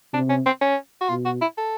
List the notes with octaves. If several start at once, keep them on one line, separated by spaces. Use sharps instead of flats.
C3 D4
C#4
C4
C#4
F#4
B2 F4
F#4
E4
A4